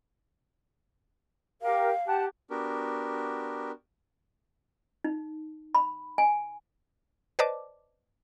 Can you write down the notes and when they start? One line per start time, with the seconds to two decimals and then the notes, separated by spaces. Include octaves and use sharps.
1.62 G4 A#4 F5
2.07 G4 F#5 A5
2.50 B3 D4 F#4 G4 A#4
5.04 D#4
5.75 B5
6.18 G#5
7.39 B4 C5 D5 D#5 A5 D6